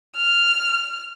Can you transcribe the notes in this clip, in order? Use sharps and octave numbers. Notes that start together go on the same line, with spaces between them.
F6